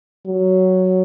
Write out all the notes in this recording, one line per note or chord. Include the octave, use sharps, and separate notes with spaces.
F#3